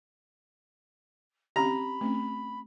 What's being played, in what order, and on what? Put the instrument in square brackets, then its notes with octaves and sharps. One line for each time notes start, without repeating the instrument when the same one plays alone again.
[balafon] C4 C#4 G4 [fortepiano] A#5 [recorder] B5
[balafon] A3 C4 C#4